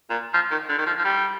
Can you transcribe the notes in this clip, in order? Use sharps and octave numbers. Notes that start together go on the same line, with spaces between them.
A#2
F3
D#3
D3
D#3
F3
F3
G3